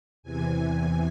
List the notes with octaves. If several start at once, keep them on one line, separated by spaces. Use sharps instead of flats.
E2 C3 E3 G#5